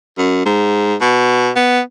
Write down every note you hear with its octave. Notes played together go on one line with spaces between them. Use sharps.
F#2
G#2
B2
B3